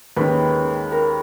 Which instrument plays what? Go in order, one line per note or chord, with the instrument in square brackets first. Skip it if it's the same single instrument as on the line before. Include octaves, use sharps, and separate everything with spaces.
[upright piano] D#2 D#3 G#3 C#4 [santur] B4
[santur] A#4